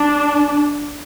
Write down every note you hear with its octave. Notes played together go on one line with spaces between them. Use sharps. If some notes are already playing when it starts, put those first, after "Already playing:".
Already playing: D4